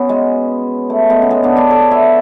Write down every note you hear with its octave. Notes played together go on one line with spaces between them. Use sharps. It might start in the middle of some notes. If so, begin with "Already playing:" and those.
Already playing: B3 C#4 F#4
G#3
A3
G#3 B3
C#4
G#3 B3
B3 D4
B3 D4
A4 C#5
C#5 E5